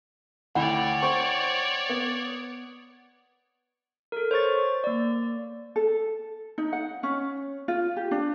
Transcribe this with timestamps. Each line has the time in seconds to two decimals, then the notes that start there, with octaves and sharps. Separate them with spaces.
0.55 D2 E4 C#5 D5 F#5 G5 B5
1.02 C5 C#6
1.89 B3
4.12 A4 A#4
4.31 C5 C#5 C#6 A6
4.84 A#3 D5
5.76 A4
6.58 D#4
6.73 F#5
7.03 C#4
7.68 F4
7.96 G4
8.11 D4